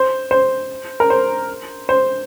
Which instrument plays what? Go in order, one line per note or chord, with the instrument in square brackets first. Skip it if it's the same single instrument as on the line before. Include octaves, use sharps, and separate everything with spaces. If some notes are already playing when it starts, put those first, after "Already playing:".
Already playing: [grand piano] C5
C5
A#4
C5
C5